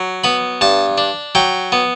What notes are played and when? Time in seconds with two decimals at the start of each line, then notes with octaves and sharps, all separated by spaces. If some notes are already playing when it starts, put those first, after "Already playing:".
Already playing: F#3
0.24 B3 B5
0.61 G2 A5
0.98 D4
1.35 F#3 G5
1.72 B3